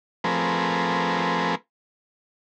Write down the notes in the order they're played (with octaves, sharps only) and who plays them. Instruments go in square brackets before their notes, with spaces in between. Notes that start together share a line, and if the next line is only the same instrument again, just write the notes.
[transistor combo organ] F3 A3 C4 G#4 A#4 B4